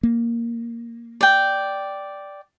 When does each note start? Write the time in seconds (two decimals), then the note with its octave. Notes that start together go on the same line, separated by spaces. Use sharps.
0.03 A#3
1.21 D5 G5